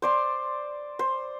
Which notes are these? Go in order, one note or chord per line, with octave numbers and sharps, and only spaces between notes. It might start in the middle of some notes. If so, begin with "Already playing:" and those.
C5 D5 C6
C5